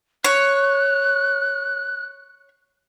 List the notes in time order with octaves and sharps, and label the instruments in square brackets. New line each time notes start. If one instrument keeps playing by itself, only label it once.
[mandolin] C#5 [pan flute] F#6